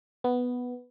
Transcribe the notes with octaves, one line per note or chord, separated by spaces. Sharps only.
B3